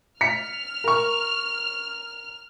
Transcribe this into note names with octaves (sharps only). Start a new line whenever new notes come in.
F6 B6 C#7
A#4 C#6